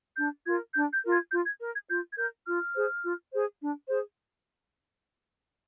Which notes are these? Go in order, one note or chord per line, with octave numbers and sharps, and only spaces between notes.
D4 G6
F4 A#4 G#6
D4 G6
G6
F4 A#4
G#6
F4 G6
G#6
A#4
G#6
F4 G6
G#6
A#4 G6
F4 F6
G#4 C5
F4
G#4 C5
D4
G#4 C5